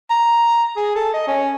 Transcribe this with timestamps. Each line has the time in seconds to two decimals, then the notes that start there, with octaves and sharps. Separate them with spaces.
0.10 A#5
0.77 G#4
0.95 A4
1.14 D#5
1.28 C#4